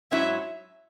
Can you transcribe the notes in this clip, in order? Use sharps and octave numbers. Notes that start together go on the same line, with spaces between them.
G#2 F#3 C#4 E4 E5